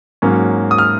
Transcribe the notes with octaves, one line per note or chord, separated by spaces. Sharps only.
G#2 F#3 A#3 C#4
D#6
F6